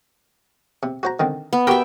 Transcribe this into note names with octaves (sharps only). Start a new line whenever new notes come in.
C3
F#4 C5 A#5
D3 D#3 C4
B3
F#4 G4 A#4 E5 G5